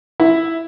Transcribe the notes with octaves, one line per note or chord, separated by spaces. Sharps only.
E4